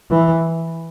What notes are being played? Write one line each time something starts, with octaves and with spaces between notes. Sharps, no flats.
E3